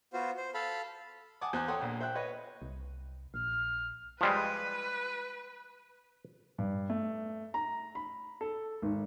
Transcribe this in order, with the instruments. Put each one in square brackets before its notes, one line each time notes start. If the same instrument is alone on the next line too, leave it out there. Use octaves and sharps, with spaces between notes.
[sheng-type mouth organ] B3 F4 F#4 C5
C5
A4 F5 A5 B5
[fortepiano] F#5 G#5 A5 D6 D#6
E2 C5 G#5 F#6
A4 C#5 F#5 G5 C6 D#6
A#1 A#2
C5 E5 G5 F#6
B4 C#5 D#5
[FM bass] C2
[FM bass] A#1 [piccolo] F6
[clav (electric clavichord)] F3 G3 G#3 [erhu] B4
[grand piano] G2
A3
A#5
B5
A4
G#1